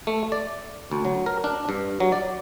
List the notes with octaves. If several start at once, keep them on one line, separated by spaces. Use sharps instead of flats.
A3
D5
D2
F#3
A#4
D4
G2
F#3
D5